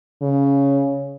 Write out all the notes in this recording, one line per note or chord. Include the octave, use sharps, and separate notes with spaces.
C#3